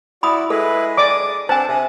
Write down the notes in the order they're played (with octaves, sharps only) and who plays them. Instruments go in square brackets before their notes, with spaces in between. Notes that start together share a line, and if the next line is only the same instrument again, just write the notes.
[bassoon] E4 [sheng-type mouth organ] F#4 D5 [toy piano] B5 D#6
[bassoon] G#3 [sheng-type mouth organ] E4 B4 [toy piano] A4
[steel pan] D5 D6 [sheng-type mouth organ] D#6
[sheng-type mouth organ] C4 D4 F#5 [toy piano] C5 G#5 [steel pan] A5
[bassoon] C3 [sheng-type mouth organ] D#6